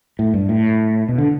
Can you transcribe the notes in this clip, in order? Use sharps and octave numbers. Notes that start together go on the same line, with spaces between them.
A2
G2
A2
B2
D3